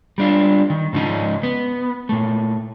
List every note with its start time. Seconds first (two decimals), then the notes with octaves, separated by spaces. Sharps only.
0.18 G3 D4 F4
0.70 D#3
0.93 G#2 C#3 F3 C#4 D#4
1.43 B3
2.09 A#2 A3